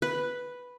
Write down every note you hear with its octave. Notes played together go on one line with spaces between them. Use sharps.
B4